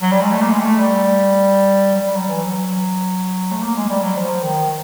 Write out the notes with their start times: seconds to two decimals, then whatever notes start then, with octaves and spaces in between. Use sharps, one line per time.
0.02 F#3
0.12 G3
0.21 G#3
0.32 A3
0.42 A#3
0.51 G#3
0.60 A3
0.78 G3
1.94 F#3
2.02 G3
2.16 F#3
2.29 E3
2.43 F#3
3.51 A3
3.62 A#3
3.76 G#3
3.89 G3
4.02 F#3
4.16 F3
4.43 D#3